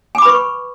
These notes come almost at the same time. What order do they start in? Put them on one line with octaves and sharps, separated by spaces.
G#5 D6 B5 B4 C#6